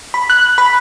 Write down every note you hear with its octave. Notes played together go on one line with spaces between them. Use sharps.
B5
F#6
B5